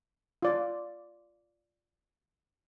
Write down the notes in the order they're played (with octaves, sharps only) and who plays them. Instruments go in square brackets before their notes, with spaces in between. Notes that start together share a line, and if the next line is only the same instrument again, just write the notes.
[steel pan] F4 D5